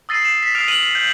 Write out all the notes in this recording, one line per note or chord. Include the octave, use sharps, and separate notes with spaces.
D#6 E6 A6 A#6 C7 D#7
C7 E7
B6
D#6 F6 A6 C7 D7 F7
F6 D#7 F7 F#7
G6